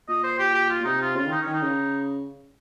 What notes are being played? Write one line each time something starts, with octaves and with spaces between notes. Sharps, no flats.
A#2 D#5
C5
G4
G4
F4
A#2
C3 D#4
F4
C#3 F4
D#3
D#4
C#4
D#3
D#4
C#3